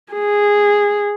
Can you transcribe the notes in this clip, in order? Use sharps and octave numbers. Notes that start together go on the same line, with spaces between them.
G#4